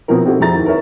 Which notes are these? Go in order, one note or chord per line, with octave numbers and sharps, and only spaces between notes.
B2 F3 C4 E4 A#4
C4 D#4 E4 F#4 G4 A4
F2 E4 G#4 A#5 A6
D#2
A#4 B4 C#5 E5